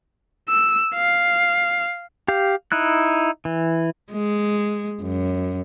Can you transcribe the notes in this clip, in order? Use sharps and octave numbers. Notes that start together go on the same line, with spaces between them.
E6
F5
G4 F5
D#4 E4 F#6
E3
G#3
F#2